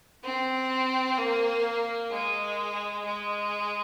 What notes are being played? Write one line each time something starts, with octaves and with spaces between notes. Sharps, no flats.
C4
A#3
G#3
G#3